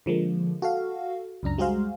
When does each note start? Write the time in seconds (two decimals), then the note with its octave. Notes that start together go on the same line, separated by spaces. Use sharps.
0.06 D3 F3 G#3 A#3
0.62 F#4 A4 F5
1.43 C#2 F#2 D4 A#5
1.58 G3 G#3 F#4 G#4 C5 F5